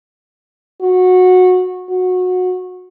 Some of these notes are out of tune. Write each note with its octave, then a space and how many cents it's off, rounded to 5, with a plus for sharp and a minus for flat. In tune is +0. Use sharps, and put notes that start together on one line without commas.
F#4 -15
F#4 -20